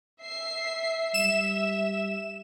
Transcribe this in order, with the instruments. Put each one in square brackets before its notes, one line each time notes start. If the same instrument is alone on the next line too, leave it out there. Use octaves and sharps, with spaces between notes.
[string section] E5 C7
[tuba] G3 [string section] E5 [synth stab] E7